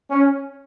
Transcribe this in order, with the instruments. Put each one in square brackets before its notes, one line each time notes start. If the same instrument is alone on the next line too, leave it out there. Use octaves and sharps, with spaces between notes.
[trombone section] C#4